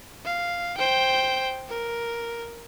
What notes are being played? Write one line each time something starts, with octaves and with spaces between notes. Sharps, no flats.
F5
C5 G5
A#4